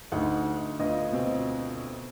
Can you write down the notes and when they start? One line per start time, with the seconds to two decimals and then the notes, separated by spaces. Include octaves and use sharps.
0.12 D2 D#4 F#5
0.80 D2 B3 F4 D#5
1.12 B2 C4